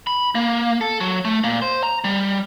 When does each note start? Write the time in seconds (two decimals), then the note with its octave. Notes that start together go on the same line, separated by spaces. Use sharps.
0.07 B5
0.35 A#3
0.81 A4
1.01 F#3
1.25 A3
1.44 A#2
1.62 C5
1.84 A#5
2.04 G3